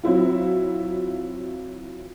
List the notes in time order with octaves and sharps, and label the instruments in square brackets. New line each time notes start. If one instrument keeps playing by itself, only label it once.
[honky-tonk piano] F#3 C4 E4 F4